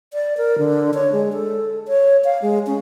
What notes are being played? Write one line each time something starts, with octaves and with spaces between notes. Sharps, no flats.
D5
A#4
D3
C#5
G#3
A4
C#5
F5
G#3
C#4